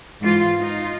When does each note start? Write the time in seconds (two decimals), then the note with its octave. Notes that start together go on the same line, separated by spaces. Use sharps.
0.22 G#2 E3 F4
0.58 D#4 F4